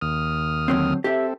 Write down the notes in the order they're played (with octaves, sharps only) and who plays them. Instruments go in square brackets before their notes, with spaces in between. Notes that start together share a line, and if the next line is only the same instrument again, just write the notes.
[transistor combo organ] D#2 D#6 F6
[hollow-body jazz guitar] D3 F#3 C4
[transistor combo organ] C4 A4 [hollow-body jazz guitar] G4 E5